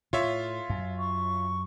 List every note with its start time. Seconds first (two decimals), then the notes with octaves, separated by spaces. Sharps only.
0.13 A2 F4 C#5 E5
0.70 F#2
0.99 C#6